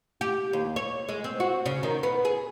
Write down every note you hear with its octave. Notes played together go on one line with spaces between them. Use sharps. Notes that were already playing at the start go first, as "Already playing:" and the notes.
G4
D#2
C#5
G#3
C4
F#4
C#3
D#3
B3
G#4